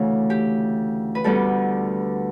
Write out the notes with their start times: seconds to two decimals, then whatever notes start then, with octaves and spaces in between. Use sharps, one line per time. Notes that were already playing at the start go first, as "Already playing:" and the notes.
Already playing: D2 C#3 E3 A3
0.30 G4
1.15 B4
1.24 D2 D3 G3 B3 A4